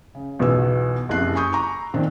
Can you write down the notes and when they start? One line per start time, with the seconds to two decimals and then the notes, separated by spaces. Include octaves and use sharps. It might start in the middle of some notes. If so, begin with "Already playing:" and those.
0.15 C#3
0.39 B1 E2 B2 B3 F4 E6
1.09 F#1 C2 F2 E4 F#6 C7
1.35 G#5 B5 C#6 D#6 G6
1.53 A#5 C#6 D6
1.94 A#2 D#3 C4 D4